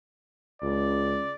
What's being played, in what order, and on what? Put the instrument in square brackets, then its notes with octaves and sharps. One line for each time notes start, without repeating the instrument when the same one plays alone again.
[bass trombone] C#2 [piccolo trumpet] D5